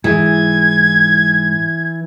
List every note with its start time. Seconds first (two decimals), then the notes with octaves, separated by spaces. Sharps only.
0.04 G#2 E3 G#6